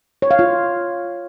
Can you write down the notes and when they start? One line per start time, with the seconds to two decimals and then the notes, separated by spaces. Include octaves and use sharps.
0.22 C#5
0.31 F5
0.39 F4